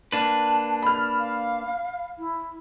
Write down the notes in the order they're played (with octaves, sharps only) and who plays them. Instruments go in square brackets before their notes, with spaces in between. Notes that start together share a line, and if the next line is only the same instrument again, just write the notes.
[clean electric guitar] A#3 D4 B4 [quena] A5
[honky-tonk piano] B5 F6
[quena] F5
E4